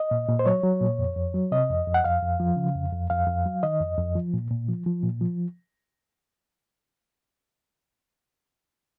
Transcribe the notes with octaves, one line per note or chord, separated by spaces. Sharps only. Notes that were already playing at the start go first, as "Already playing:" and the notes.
Already playing: D#5
A#2
A#2
C5
F#3 C#5
F#3
A#2
F2
F2
F#3
C3 D#5
F2
F2
F#5
F2 F5
F2
F3
C#3
F2
F2
F2 F5
F2
F#3
D#3 D#5
F2
F2
F3
A#2
A#2
F3
F3
A#2
F3